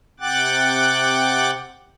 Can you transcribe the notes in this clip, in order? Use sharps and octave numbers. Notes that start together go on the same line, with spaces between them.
C3 F#5 G5 D6 F#6 A6